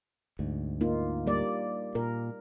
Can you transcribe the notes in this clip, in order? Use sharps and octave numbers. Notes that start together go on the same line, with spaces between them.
D2 G#2
A#3 D#4 F4
G3 A#3 D5
A#2 A#4